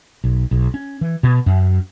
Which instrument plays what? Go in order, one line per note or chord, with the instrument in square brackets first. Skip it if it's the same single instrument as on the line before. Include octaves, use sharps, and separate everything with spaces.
[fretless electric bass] B1
B1
C#4
E3
B2
F#2